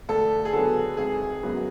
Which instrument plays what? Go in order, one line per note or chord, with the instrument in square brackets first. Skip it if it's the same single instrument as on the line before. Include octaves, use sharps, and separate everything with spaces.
[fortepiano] D2 [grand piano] A4
[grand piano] G#4
[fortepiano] D3 F#3 B3 [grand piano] A4
[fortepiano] G#1 [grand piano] G#4
[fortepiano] F#2 C#3 F#3 B3